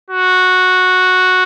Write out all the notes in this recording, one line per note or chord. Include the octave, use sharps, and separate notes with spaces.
F#4